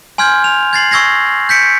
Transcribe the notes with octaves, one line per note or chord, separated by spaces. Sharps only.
G#5 C6 F6 G6 G#6
F7
G#6 A6 C7 F#7
C#6 E6 G#6 A#6 C7
G6 B6 C#7 D7